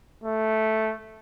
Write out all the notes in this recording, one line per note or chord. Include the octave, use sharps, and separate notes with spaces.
A3